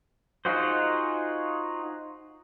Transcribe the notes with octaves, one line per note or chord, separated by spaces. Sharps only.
D#4 F4 F#4 G#4 C5